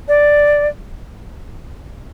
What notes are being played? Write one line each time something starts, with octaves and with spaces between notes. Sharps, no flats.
D5